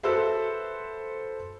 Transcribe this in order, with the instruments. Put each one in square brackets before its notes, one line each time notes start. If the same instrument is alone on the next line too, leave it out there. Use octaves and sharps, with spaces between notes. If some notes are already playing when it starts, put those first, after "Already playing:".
[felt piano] F#4 A4 B4 C5 E5